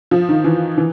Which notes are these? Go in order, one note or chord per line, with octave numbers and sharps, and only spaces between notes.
F3
D#3
E3
E3